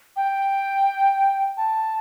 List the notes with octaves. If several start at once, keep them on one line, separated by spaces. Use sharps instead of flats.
G5
A5